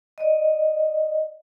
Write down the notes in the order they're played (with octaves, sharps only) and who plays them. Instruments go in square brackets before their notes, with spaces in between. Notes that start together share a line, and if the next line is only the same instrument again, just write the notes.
[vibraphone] D5 D#5